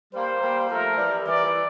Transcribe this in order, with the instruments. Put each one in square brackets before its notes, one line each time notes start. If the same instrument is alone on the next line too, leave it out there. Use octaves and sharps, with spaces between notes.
[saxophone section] G3 A#3 [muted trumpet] C5
[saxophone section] G3 A#3
[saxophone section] F3 A3 [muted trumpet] A#4
[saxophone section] E3 G3
[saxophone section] E3 [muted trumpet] D5
[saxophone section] E3